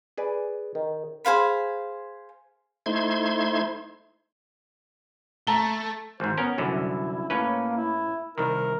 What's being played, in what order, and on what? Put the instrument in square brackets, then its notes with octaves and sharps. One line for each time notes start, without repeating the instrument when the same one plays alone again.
[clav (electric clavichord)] G#4 B4 D5
D#3
[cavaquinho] G#4 C5 F5 B5
[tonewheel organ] A3 D#4 E4 C5 C6 G#6
[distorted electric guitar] A3 [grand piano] A5 A#5 G7
[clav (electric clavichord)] G#1 G#2 [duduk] C5
[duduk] B3 [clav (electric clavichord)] C#4 A#4
[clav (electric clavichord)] C2 F#2 D3 [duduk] E4
[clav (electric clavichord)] A2 C#4 B4 [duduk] A#3
[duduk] E4
[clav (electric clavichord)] C2 D#3 [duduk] A#4